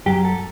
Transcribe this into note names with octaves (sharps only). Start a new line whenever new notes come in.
F#2 F#3 G4
A4